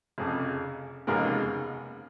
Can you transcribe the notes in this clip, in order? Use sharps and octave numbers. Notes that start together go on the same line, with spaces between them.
F1 F2 C#3 G#4
F1 D#2 C#3 G#3 B3 A#4